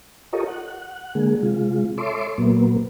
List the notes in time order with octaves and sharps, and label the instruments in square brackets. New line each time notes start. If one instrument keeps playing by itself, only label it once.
[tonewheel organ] F4 G4 A4 A#4 C#5 D#5
F#5
D3 G#3 A#3 G#4
C3 G#3 F4
A4 C#5 E5 C6 D6
A#2 F#3 A#3 B3